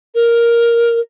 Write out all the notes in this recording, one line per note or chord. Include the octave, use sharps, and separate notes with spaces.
A#4